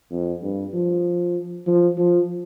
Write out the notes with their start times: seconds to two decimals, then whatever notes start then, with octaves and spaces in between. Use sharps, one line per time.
0.11 F2
0.43 G2
0.73 F3
1.67 F3
1.98 F3